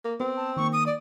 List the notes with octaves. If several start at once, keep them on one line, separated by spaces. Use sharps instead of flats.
A#3
B3 C4
A5
D#3 A#3 C#6
D#6
D5